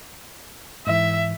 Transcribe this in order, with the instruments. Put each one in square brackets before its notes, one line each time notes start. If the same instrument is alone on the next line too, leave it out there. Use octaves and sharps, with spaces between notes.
[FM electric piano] G#2 E3 [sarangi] E5